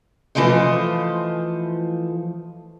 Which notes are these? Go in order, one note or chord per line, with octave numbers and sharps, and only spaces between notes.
E3 F3 A3 C5 D#5